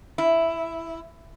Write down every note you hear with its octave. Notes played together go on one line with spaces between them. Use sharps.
E4